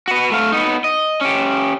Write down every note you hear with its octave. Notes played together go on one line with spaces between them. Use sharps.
F#4 B4
A3 F5
B3 D#4
D#5
C#4 G4